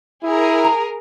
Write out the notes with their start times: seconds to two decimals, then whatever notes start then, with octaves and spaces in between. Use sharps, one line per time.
0.24 E4 G#4 A#4
0.64 A#5